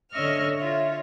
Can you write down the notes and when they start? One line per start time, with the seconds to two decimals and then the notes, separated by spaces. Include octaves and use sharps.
0.11 D3 C#5 D#5 E5 C#6 F6
0.58 F4 C#5 E5